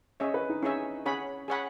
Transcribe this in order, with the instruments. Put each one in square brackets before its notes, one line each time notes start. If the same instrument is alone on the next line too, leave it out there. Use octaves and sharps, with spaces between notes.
[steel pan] C#4 G#4 C#5 E5 [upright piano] D#5
[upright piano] B4
D#4
[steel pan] C#4 G#4 C#5 E5 [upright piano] D#4
[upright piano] C#4 [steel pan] G#4 C#5 F#5 B5
[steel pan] G#4 C#5 F#5 B5